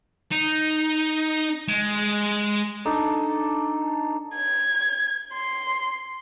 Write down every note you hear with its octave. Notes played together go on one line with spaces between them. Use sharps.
D#4
G#3
D4 D#4 A4
G#6
C6